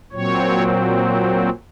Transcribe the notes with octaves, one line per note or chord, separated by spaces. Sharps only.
A#2 F#3 C4 C#5